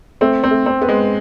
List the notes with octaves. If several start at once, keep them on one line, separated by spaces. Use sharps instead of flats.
A3 C4
C4
A3
C4
B3
G#3